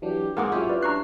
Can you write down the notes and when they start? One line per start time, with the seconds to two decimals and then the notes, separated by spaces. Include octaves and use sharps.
0.02 E3 F#3 D4 G4
0.37 G#2 A#3 C4 G#4 A#4 F#5 D6
0.52 F#3 C#4 E4 F4 G4
0.69 B4 D5
0.83 D4 A#5 C#6 F#6 C7